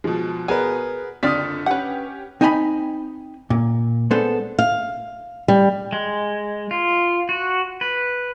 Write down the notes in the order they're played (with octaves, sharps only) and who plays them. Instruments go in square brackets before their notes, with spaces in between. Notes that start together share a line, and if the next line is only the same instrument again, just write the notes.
[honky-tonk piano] B2 G#3 [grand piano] F3
[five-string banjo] B3 G#5 [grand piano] G#4 A#4 B4
[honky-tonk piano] F#1 D3 [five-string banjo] C4 F4 D5 [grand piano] D#6 F6 B6
[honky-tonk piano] C#4 G4 [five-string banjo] B4 F#5
[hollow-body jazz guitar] C4 D#4 D#5 G#5 A5 B5
A#2
G#3 B3 D4 A4 C5
[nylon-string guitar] F5
G3
[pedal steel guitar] G#3
F4
F#4
B4